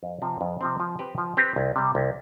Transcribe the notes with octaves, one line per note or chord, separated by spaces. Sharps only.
F2
C3 F3 C4
F2
C3 F3 C4
F3
C4 G4 B4
F3
C4 G4 B4
C2
C3 G3
C2